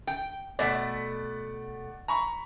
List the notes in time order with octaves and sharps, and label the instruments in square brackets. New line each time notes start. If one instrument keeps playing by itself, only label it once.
[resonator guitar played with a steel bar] G5
[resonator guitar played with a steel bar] B2 A3 [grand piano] D5 F#5 B6
[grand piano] A#5 B5 C#6